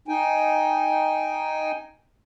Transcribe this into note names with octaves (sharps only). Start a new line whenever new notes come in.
D#4 G5 G#5